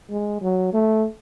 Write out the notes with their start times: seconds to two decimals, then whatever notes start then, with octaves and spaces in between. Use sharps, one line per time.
0.10 G#3
0.41 F#3
0.73 A3